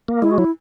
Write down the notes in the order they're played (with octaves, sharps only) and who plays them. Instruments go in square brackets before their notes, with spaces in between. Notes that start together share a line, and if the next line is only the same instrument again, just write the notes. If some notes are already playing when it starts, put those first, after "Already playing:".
[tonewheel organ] A#3
[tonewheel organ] G#3 [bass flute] E4
[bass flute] F#4
[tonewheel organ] F#3 [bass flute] E4